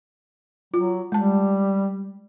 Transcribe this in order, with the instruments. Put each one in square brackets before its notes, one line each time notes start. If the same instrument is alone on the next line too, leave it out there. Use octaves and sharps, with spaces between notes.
[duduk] F#3 [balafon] F4
[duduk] G3 [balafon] G#3 A5